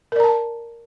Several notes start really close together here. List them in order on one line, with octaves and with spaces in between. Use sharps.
A#4 D5 A#5 A5